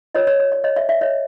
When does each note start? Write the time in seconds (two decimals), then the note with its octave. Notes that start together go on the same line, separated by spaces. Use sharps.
0.15 F4 A#4 C#5 D#5
0.27 C#5
0.40 C#5
0.52 D5
0.64 C#5 D#5
0.76 D5 E5
0.89 D5 E5
1.01 C#5 D#5